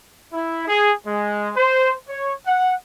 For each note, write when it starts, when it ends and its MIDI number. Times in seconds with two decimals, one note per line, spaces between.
0.33 0.65 64
0.68 0.91 68
1.06 1.50 56
1.56 1.93 72
2.08 2.32 73
2.46 2.73 78